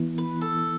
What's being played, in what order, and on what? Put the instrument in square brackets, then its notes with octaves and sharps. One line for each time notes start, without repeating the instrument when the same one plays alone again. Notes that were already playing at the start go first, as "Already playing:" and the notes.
Already playing: [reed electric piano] E3 B3 E4
[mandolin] B4
A4